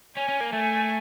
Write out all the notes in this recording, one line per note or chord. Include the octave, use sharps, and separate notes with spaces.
C#4 G#5
C#4
A#3
A3 G#5